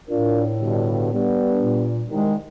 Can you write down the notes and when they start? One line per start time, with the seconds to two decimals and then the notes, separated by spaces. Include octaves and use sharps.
0.10 A2 D4 F4 A#4
0.61 G2 B2 D3
1.13 G3 B3 D4
1.60 A#2
2.10 C2 D#3 G#3